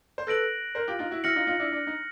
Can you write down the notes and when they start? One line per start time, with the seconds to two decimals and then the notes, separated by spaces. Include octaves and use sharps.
0.18 C5
0.27 A4 B4 F#6 A#6 D7 F#7
0.75 A#4 C5
0.88 F4 G4
0.99 D#4 F4
1.11 E4 F#4
1.24 E4 F#4 F6 A#6 C#7 F#7
1.36 D#4 F4
1.47 D#4 F4
1.59 D4 E4
1.72 D4
1.87 D#4